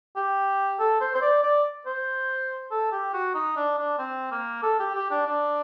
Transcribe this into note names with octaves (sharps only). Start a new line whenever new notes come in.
G4
A4
C5
C5
D5
D5
C5
A4
G4
F#4
D#4
D4
D4
C4
A#3
A4
G4
G4
D4
D4